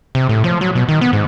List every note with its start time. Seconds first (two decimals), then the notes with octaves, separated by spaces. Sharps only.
0.15 C3
0.29 A2
0.44 F3
0.61 F#3
0.75 B2
0.89 D#3
1.01 B3
1.13 G#2